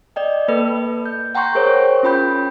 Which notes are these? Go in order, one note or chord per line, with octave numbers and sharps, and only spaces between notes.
D5 D#5 G5
A#3 A4 B4
G6
F#5 G5 A#5 C6 C#6 G6
G#4 A#4 C5 C#5
C#4 F4 G5 B5 G6